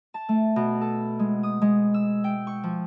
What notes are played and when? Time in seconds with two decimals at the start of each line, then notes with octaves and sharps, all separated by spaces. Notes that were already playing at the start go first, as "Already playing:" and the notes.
0.14 A5
0.29 A3
0.56 B2
0.81 A4
1.19 G#3
1.43 D#6
1.62 G#3
1.94 E6
2.24 G5
2.47 C#6
2.64 F3